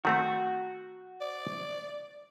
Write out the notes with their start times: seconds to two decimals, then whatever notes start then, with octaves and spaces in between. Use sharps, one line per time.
0.05 D#3 A3 C4 F#4
1.21 D5